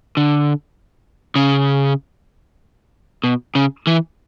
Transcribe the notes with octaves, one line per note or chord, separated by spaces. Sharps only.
D3
C#3
B2
C#3
E3